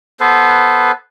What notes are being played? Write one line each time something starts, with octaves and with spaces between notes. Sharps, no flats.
B3 A4 B4 C5